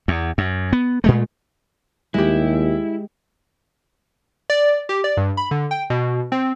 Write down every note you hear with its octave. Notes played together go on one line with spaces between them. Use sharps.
E2
F#2
B3
A#2 G#3 A3
D#2 G#3 E4 G4
D5
G4
D5
G2
B5
D3
G5
B2
C4